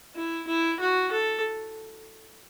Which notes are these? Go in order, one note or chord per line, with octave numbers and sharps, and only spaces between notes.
E4
E4
F#4
A4